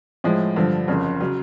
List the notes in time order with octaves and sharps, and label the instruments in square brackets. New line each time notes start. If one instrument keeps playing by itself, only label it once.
[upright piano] A2 F3 G#3
G2 D3 F3
F#1 F2 C#3
C#3 F#3